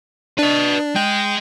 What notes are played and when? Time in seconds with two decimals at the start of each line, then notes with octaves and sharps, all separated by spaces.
0.39 D4 B4 D#5
0.96 G#3 D#5 G5